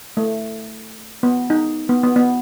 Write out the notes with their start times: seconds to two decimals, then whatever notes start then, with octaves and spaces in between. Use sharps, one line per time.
0.17 A3
1.23 B3
1.50 D#4
1.89 B3
2.03 B3
2.16 B3